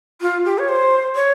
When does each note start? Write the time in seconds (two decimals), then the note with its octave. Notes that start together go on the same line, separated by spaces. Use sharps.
0.21 F4
0.45 G4
0.58 C#5
0.68 C5
1.15 C#5